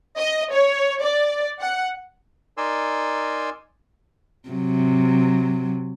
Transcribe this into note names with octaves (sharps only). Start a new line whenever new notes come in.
D#5
C#5
D5
F#5
D#4 A#4 D5 G#5 C6 E6
C3 F#3